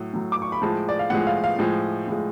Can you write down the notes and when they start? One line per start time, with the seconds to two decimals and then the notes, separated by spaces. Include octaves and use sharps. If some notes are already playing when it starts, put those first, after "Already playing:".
Already playing: A2 F#3
0.13 A2 F#3
0.32 D6
0.42 C#6
0.52 B5
0.62 A2 F3 G#3 A5
0.89 D5
0.99 F5
1.10 A2 F3 G#3 F#5
1.27 F5
1.44 F5
1.59 A2 F3 G#3
2.08 A2 F3 G#3